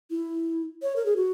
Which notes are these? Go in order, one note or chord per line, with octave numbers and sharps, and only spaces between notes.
E4
C#5
A#4
G#4
F#4